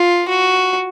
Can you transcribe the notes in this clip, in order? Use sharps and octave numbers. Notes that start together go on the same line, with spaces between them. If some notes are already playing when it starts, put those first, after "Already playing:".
Already playing: F4
F#4